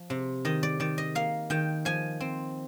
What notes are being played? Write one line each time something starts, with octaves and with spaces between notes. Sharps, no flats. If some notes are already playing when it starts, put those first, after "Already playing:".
Already playing: F3
C3
D#3 D#5
D5
D#3 D5
D#5
A#3 F5
D#3 G5
F3 G#5
C4